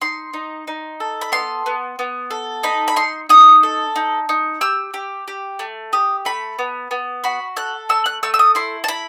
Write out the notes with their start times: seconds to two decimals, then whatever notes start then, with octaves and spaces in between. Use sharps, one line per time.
0.01 D#4 C6
0.33 D#4
0.67 D#4
1.00 A4
1.21 B5
1.32 B3 C6
1.66 B3
1.99 B3
2.31 A4
2.63 D#4 B5
2.88 B5
2.96 D#4 C6
3.29 D#4 D#6
3.63 A4
3.96 D#4
4.29 D#4
4.61 G4 E6
4.94 G4
5.28 G4
5.59 A3
5.93 G4 D#6
6.25 A3 B5
6.59 B3
6.91 B3
7.24 F#4 B5
7.56 A4 F#6
7.89 A3 E6
8.06 F#6
8.23 A3 E6
8.34 E6
8.39 D#6
8.55 E4 C6
8.84 A5
8.88 E4 B5